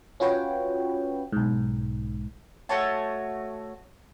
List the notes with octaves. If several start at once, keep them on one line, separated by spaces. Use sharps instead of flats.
C#4 F4 F#4 B4 C#5 G5
B1 G#2
A3 F#4 C#5 A5